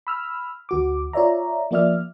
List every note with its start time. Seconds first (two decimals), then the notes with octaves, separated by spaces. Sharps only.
0.07 B5 E6 F6
0.69 D2 F#4 D6
1.13 F4 C#5 D5 E5 A#5
1.71 F3 A#3 F4 D5 E5 F6